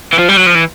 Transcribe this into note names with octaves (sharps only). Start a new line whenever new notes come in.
E3
F3
G3
F#3
F3
E3